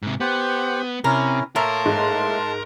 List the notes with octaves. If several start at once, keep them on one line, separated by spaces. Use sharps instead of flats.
G#2 C3
B3 G4 C5 F#5
C3 C#4 E4 A#4
A2 A#3 A#4 A5 C6
G#2